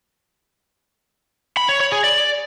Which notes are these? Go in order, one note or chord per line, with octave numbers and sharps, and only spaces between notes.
B5
C#5
C#5
G#4
D5